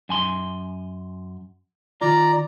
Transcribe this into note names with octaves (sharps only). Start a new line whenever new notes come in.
F#2 G#5 C6
D#3 F4 D5 A#5